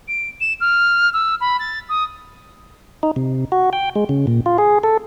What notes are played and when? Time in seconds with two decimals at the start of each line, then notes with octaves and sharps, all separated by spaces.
0.08 D7
0.41 E7
0.61 F6
1.13 E6
1.41 B5
1.59 A6
1.89 D#6
3.03 D#4
3.16 C3
3.52 F#4
3.73 G5
3.96 G#3
4.09 C#3
4.27 A#2
4.46 F4
4.58 G#4
4.84 A4